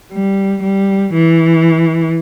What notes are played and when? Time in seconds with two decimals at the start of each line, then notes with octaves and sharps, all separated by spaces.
0.12 G3
0.63 G3
1.14 E3